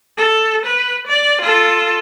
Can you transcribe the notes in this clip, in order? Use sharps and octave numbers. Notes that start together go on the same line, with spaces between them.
A4
B4
D5
F4 A4